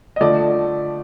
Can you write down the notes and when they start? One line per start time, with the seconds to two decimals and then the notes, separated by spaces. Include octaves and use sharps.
0.16 D#5
0.21 D3 F3 A3 D5